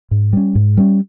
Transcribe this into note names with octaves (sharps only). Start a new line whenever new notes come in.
G#2
G3 C#4
G#2
G3 C#4